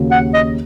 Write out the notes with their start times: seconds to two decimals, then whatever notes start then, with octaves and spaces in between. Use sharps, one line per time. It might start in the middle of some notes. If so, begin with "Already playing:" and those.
Already playing: D#2 C#3 A#3 F#4
0.11 F#5
0.34 D#5